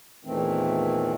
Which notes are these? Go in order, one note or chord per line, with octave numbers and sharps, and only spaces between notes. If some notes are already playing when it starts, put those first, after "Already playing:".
E2 A#2 D#3 E3 A3 C4